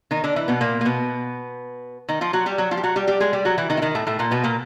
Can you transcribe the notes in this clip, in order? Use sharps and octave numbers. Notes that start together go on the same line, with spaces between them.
D#3 D#4
D3 D4
E3 E4
B2 B3
A#2 A#3
A#3
B2 B3
D#3 D#4
F3 F4
F#3 F#4
G3 G4
F#3 F#4
F3 F4
G4
F#3 F#4
G3 G4
G3 G4
G#3 G#4
G3 G4
F#3 F#4
E3 E4
D#3 D#4
E4
D#3 D#4
A2 A3
A2 A3
A#2 A#3
B2 B3
A#2 A#3